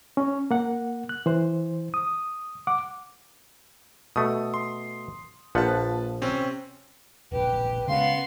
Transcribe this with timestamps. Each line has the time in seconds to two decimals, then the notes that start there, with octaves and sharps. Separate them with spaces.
0.17 C#4
0.51 A#3 F#5
1.09 F#6
1.26 E3 C5
1.94 D#6
2.67 F#5 D6
4.16 B2 A3 D#6
4.54 C6
5.55 A#1 F3 B4 F#5 A5
6.21 C3 C4 C#4
7.32 E1 A#1 G4 B4
7.88 C#3 G#3 B3 C#4 F5 C6